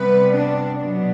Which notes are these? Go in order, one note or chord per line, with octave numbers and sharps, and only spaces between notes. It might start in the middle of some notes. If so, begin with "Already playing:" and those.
Already playing: C3 G3 B3 B4
D4
B2 F#3 B3 D4